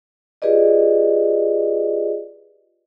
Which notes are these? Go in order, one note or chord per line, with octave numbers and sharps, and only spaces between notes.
F4 G4 G#4 B4 D5 D#5